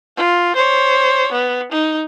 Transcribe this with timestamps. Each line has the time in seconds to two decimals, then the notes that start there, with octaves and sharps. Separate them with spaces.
0.17 F4
0.56 C5 C#5
1.32 B3
1.72 D#4